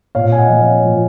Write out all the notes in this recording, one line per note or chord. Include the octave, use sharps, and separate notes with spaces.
A#2 C#5 F5
G#5
D#5 F#5
F3
C#5 F5
F3